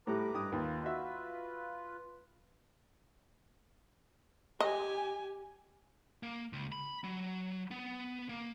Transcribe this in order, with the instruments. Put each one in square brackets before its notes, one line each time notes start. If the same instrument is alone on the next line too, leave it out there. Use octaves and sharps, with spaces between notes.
[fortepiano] A2 G3 [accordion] B4 A#5 D6
[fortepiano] G2 D#6
[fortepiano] D#2 [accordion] F4 B4
[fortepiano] F#4 E5
[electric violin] G4 G#5 [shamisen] D#5
[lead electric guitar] A#3
C#2
B5
F#3
B3
A#3